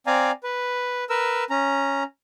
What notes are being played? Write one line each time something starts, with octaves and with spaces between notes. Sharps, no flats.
C4 D5 F5 G#5 A#5
B4
A#4 B4 E6
C#4 A#5